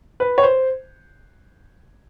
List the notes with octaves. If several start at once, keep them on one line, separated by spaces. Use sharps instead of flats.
B4
C#5
C5